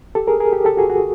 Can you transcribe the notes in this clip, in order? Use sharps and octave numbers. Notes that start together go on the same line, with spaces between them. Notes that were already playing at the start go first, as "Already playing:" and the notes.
G4 A4
G#4 A#4
G#4 A#4
G4 A4
G4 A4
F#4 G#4
F#4 G#4